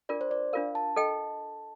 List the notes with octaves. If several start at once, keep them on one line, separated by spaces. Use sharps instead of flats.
D4 F4 A#4 D5
C5
D5
D4 F4 A#4 F5
A5
A4 D#5 G5